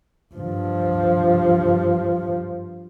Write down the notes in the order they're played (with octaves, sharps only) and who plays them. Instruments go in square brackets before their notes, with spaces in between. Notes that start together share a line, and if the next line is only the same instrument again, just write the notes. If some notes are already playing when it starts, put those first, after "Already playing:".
[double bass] G2 F3